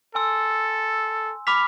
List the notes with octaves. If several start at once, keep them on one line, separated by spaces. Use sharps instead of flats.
A4 G#5 C6 E6
B5 D6 F6 B6 F7